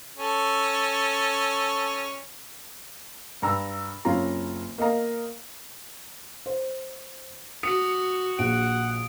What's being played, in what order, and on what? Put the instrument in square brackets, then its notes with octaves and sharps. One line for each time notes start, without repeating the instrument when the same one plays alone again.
[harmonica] C#4 A4
[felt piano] G2 A#5 E6
F#1 C4 C#4 F4 A#5
A#3 D#5 F5 A#5
C5
[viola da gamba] F#4 [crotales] D#6 [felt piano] C#7
[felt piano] A#1 [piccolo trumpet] F#5 [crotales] D7